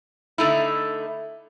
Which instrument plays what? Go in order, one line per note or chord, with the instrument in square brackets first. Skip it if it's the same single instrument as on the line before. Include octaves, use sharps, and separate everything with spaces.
[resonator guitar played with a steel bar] D3 A3 D#4 E4